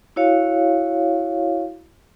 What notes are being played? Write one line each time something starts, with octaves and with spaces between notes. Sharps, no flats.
E4 F#4 C#5 F5